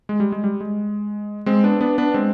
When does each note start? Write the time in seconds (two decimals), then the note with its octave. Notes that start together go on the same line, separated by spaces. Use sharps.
0.09 G#3
0.20 G3
0.32 G#3
0.44 G3
0.61 G#3
1.46 G#3 C4
1.64 B3 D4
1.81 B3 D4
1.98 B3 D4
2.14 G#3 C4